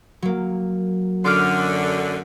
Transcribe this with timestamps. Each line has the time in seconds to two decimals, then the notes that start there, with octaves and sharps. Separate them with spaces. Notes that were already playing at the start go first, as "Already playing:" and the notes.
0.22 F#3 A#3
1.24 F#2 D3 C6 D6 F6